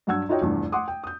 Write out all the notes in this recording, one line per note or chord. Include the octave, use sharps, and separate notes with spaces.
G2 F#3 F#5 E6 G#6
D#4 F4 F#4 C#5 D#5 G5
F1 E2 G2
F#5 C6 D6 D#6
G5
D#6 G6